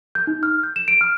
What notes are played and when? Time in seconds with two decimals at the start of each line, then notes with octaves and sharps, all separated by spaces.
0.15 G6
0.27 D#4
0.43 F6
0.63 G6
0.76 E7
0.88 D7
1.01 F6